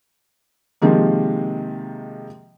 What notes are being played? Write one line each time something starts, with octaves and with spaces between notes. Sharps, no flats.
C3 D#3 F3 G#3 A#3